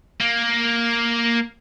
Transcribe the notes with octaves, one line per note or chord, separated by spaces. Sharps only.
A#3